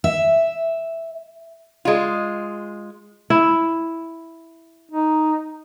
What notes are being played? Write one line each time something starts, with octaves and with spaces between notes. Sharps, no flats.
E5
G#3 F4
E4
D#4